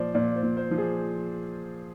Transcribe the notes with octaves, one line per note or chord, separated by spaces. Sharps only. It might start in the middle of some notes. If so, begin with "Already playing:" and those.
Already playing: A#2 F3 C5 D5
A#2 D5
C5
A#2
C5
F3
G#4